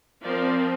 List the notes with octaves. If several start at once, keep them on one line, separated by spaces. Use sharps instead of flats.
F3 C4 A#4 D5